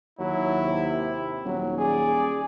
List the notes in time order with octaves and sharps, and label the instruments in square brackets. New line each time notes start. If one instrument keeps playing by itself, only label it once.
[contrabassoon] D#2 [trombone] F#3 [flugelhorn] E4
[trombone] C3
[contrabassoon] D#1 [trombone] F#3
[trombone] G#4 [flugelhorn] D5